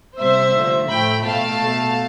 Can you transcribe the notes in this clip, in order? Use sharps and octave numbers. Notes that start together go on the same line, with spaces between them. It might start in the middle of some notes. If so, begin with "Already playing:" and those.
C3 G3 C5 E5
D3 F3 A3
A2 F3 A3 G5 B5
B2 A3 F5 A5
B2 A3